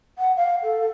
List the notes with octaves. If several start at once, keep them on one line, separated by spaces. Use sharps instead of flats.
F#5
F5
A4